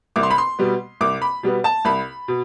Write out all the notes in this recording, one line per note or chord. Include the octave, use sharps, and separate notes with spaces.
C2 D6
C6
B5
C6
B2 G3 B3
C2 D6
B5
B2 G3 B3
A5
C2 B5
B2